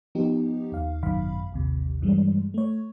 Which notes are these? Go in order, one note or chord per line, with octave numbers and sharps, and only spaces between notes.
F3 B3 D#4 G4
D#2 F5
G#1 F#2 B2 D#3 F5 B5
A1 D#2 C3
G2 E3 G3 G#3
A3 C#5